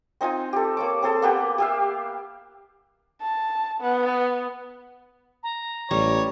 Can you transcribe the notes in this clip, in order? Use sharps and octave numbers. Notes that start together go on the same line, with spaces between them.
C4 D#4 F4 G#5
G4 A4
A#3 C#5 D6
C4 G#4 A4 A5
A#3 B3 G4
G4 E5 F5
A5
B3
A#5
A1 G3 C#5